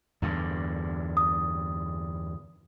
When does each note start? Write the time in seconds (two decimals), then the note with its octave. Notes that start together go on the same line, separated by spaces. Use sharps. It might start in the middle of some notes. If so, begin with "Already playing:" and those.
0.22 E2 G2 D3
1.17 D#6